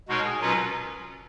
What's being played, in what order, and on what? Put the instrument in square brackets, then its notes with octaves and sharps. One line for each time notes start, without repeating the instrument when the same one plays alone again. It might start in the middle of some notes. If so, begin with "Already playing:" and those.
[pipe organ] B2 G#3 D#4 A#4 C#5 [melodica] F#4
[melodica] G#4
[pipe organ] B2 F#3 C#4 F4 B4 [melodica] A#4